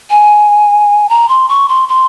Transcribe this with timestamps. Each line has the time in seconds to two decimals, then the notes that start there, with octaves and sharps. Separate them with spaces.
0.11 G#5
1.09 A#5
1.29 C6
1.49 C#6
1.69 C6
1.89 C6